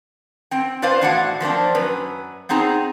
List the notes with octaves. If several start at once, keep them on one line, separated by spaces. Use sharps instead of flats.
C4 G5
F4 B4 C5 D5 F5
E2 A2 D4 F#4 F5 F#5
F3 A#3 C4 D4
F#2 F#3 B4
B3 C4 D#4 G#4 A#5